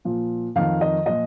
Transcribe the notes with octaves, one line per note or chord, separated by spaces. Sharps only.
A#2 F3
F2 D#3 F5
D#5
A#2 F3 D#5